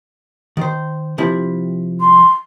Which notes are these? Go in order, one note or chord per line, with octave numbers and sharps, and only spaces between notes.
D#3 C5
C3 F3 E4
C6